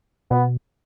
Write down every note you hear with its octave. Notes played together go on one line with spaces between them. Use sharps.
B2 B3